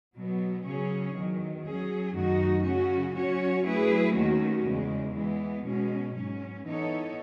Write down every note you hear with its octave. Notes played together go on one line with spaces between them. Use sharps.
B2 F#3 B3
C#3 F#3 C#4 G#4 C#5
E2 D#3 F#3
F#3 C#4 G#4
F#2 D#3 A3 D#4 F#4
C#3 F#3 C#4 F#4
F#3 C#4 F#4 C#5
F#3 A3 E4 G#4 B4
D#2 D#3 A3 C#4 F#4
E2 C#3 G#3
E3 G#3 B3
B2 G#3 C#4
G#2 F#3 C#4
E3 B3 D#4 A4 C#5